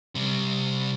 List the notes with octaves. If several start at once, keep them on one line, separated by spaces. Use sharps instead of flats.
C3 G3